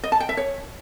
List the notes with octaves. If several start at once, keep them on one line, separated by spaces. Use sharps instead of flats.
D#5
A5
G5
E5
C#5